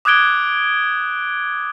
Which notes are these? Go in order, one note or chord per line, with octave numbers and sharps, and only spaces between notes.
D6 D#6 F#6 G#6 D7 G7